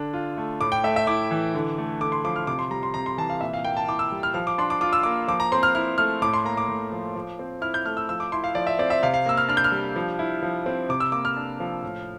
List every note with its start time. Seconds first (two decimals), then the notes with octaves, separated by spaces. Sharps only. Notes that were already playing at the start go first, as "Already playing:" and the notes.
Already playing: D3 D4
0.13 F4
0.37 A3
0.61 A2 D6
0.72 G5
0.84 A3 E5
0.96 E5
1.07 E4 D6
1.31 E3
1.55 D3
1.78 A3
2.00 D3 D6
2.12 C6
2.25 F3 D6
2.36 F6
2.47 C3 D6
2.59 C6
2.71 G3 A#5
2.83 C6
2.94 C3 A#5
3.06 C6
3.17 E3 A5
3.30 F5
3.41 A#2 E5
3.53 F5
3.65 A#3 G5
3.77 A5
3.88 E4 D6
3.99 E6
4.12 G3
4.23 F6
4.34 F3 F6
4.47 D6
4.58 D4 C6
4.70 D6
4.81 F4 D6
4.93 E6
5.03 A#3 D6
5.28 F3 D6
5.40 A#5
5.52 C4 C6
5.63 F6
5.75 E4 F6
5.98 A3 F6
6.22 A2 D6
6.33 C6
6.45 A#3 A#5
6.57 D6
6.68 A2
6.92 F3
7.15 F3
7.39 C4
7.61 E4 F6
7.74 G6
7.85 A3 F6
7.97 E6
8.09 F3 E6
8.20 D6
8.32 E4 C6
8.44 F5
8.55 F3 D5
8.67 E5
8.79 C4 D5
8.90 E5
9.03 C3 F5
9.14 F5
9.26 A#3 E6
9.37 F6
9.48 D4 F6
9.57 G6
9.64 F6
9.72 G3
9.96 F3
10.19 E4
10.42 F3
10.66 C4
10.89 C3 D6
11.00 E6
11.12 A#3 D6
11.25 F6
11.37 D4
11.60 F3
11.83 A2